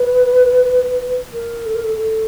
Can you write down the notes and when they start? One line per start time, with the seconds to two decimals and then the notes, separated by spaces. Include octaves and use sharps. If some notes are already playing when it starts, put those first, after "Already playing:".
Already playing: B4
1.33 A#4
1.66 A4
1.75 A#4
1.84 A4
1.97 A4